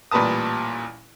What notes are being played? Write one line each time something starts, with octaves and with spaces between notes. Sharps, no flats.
A1 A#2 G3 B4 A5 D#6